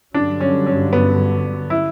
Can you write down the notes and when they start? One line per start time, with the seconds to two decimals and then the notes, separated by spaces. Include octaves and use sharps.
0.14 G2 D3 F#3 D4
0.40 C#4
0.66 C#4
0.93 B3
1.70 E4